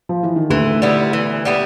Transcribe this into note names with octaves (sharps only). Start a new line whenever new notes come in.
F3
E3
D#3
D2 D3 E3
G3 B3 E4
E3
G3 B3 E4